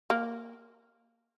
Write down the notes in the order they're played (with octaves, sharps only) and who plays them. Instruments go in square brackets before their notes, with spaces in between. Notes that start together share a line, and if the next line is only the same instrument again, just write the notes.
[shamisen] A#3